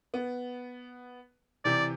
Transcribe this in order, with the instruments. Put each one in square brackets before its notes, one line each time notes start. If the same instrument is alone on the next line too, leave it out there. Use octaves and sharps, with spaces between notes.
[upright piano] B3
[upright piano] C3 E3 G4 [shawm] D5